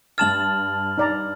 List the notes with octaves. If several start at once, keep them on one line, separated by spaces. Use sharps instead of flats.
G2 A5 F6 A6 E7 F#7
D#4 D5 A#5